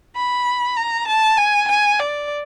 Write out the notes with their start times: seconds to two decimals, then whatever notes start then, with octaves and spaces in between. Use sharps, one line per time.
0.16 B5
0.76 A#5
1.08 A5
1.37 G#5
1.68 G#5
1.99 D5